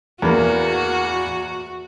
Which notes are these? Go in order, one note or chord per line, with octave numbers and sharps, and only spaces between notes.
E2 A#3 F#4